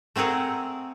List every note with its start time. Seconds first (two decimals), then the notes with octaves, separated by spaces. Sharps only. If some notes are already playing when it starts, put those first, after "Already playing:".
0.16 A3 C4 G#4 A#4 F#5